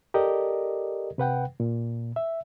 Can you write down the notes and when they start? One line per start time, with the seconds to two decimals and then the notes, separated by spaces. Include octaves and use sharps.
0.14 G4 A4 A#4 D5 D#5
1.18 C3 B4 F#5 G5
1.60 A#2
2.16 E5